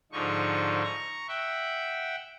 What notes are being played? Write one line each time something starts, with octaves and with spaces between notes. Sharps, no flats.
G#2 D3 F3 D#4 C#6
A#5 C#6
E5 F#5 G5